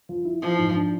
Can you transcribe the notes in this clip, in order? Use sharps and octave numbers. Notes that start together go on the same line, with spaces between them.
F3
E4
E3 F3
G#2
D4